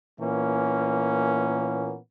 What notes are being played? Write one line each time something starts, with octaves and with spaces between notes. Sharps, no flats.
A#2 E3 A#3 B3 C#4